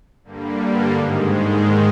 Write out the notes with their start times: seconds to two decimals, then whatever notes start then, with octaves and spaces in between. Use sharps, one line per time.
0.24 G2 D3 G3 A#3
0.91 G#2 D#3 G#3